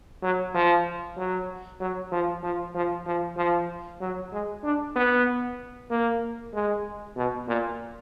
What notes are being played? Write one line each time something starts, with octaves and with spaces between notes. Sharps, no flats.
F#3
F3
F#3
F#3
F3
F3
F3
F3
F3
F#3
G#3
D4
B3
A#3
G#3
B2
A#2